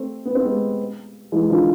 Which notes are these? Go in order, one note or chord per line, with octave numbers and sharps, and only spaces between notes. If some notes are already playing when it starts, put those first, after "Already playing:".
Already playing: A3 C4
B3
C4
G#3 B3
E3 G#3
D3 F3